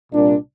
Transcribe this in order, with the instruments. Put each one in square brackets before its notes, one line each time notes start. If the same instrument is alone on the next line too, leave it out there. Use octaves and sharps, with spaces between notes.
[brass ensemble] C2 A#2 D4